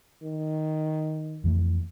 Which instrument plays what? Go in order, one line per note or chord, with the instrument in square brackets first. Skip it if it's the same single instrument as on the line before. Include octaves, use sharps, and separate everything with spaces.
[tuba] D#3
[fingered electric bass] F2 E3 A3